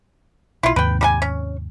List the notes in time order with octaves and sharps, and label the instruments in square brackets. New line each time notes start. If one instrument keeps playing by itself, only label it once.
[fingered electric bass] B1 [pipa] E4 F4
[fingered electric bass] D#2 G#2 C3 [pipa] B4 G5
[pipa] G3 A#4 G#5
C#4